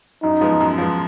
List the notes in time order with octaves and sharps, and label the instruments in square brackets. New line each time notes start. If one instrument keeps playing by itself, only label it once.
[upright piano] F#2 [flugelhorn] D#4
[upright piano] F3 G#3 B3
F#2
F3 G#3 B3